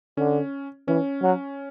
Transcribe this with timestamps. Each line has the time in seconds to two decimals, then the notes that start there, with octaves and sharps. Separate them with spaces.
0.17 D3 C#4
0.88 E3 C#4
1.22 F#3